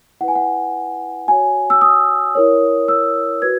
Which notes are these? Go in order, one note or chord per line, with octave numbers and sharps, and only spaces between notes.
E4 B4 F#5 G#5
F#5
F#4 C#5 G#5
E6
D#6
E4 A#4 C#5
E6
F#4 B4 G#6